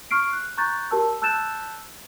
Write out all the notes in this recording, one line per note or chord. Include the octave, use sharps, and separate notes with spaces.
C#6 F6 C7 D7
F#6
A#5 C#6 F#6 G6 A6
G4 A#4 A5 E6
A5 E6 F#6 G6 A6 E7